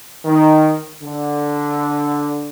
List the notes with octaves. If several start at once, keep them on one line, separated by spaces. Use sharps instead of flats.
D#3
D3